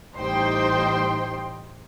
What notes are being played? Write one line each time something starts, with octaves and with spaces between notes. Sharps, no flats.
A1 G3 D#4 C5 G5 C6